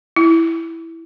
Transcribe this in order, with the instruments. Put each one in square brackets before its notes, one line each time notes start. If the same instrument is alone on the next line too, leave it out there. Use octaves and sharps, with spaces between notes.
[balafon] E4